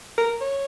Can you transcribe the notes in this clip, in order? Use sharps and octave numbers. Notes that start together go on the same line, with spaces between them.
A#4
C#5